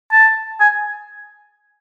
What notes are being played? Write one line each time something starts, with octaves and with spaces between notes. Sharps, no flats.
A5
G#5